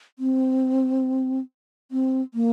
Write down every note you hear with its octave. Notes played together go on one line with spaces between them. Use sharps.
C4
C4
A#3